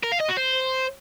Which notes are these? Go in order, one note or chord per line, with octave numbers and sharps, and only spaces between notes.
A#4
F5
D#5
F#4
C5